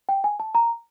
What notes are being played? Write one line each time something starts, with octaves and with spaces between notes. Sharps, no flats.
G5
G#5
A5
A#5